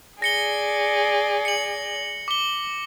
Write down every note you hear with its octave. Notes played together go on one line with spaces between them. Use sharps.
G#4 D5 A#6 C#7 G7
C#7 F#7
D6 G7